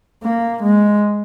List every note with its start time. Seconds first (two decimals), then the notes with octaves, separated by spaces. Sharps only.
0.23 A#3
0.63 G#3